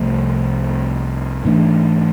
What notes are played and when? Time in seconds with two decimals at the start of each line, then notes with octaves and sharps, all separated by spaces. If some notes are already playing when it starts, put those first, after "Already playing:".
Already playing: C2 C3 F3 A3
1.45 G#2 E3 A3 D4